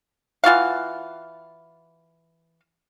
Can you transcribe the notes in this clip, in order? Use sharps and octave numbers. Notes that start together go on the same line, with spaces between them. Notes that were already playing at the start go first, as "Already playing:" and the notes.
E3 F4 F#4 F5